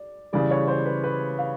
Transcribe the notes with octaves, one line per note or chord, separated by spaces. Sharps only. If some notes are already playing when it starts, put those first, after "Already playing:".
Already playing: D5
C#3 E3 G3 D5
C#5
C5
B4
B4
F5